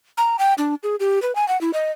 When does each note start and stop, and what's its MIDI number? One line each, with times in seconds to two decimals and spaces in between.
0.18 0.36 82
0.39 0.54 79
0.58 0.75 62
0.83 0.96 68
1.00 1.21 67
1.22 1.34 71
1.35 1.47 80
1.48 1.59 78
1.61 1.71 64
1.73 1.91 75